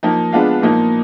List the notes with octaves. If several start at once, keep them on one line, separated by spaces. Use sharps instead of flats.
F3 A#3 D#4
G#3 B3 D4 F4
A#2 F3 A#3 D#4